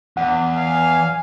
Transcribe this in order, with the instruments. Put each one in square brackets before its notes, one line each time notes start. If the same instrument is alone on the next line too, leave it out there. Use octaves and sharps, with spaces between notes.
[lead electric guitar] E2 [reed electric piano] F#5
[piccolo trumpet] F5 [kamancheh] G#5